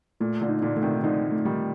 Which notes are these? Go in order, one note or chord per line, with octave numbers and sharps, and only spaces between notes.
A#2 A3
A#2 D3
D#4
A#2 D3
D3 A3
C3 D#3
D3 F3 D#4
A3
D#3 G3